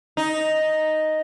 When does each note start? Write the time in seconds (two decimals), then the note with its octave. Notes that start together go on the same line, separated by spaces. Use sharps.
0.17 D#4